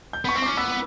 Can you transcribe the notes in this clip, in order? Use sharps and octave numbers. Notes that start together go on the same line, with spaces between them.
G6
B3 C#6
C4
D6
C#4
B3 E6